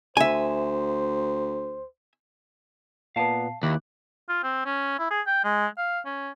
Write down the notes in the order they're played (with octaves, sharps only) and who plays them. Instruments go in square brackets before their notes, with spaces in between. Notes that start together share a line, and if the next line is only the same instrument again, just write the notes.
[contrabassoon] D2 [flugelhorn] C5 [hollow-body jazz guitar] E5 G#5
[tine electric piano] A#2 B3 [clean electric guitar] F5 A5
[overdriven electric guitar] D#2 [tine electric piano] E4 D6 F#6
[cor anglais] F4
C4
C#4
E4
G#4
G5
G#3
F5
C#4